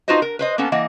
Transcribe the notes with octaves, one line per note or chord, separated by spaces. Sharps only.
D#4 F4 F#4 B4 C5 D#5
A#4
B4 C5 D#5
A#3 B3 C#4 A4
E3 A#3 D#5 F#5